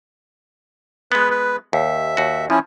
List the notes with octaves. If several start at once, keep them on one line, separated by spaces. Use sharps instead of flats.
G#3 B3 B4
B4
D#2 E5
D#2 F#4
F3 C#4 E4